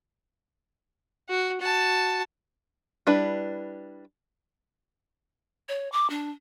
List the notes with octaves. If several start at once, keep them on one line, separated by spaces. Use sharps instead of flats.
F#4
F#4 A5
G3 D4 E4 B4
C#5
D6
D4